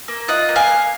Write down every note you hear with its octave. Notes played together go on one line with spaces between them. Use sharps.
A#3
F4 D#5 F#5
A#3
F5 G#5
A#3